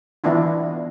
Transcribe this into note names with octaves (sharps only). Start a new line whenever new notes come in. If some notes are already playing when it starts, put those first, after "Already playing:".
E3 B3 D4 E4 F4